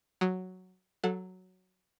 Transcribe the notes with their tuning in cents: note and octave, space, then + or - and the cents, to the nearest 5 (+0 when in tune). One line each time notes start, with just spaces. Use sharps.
F#3 +0 D#6 +0
F#3 +0 A4 +0 F#5 -35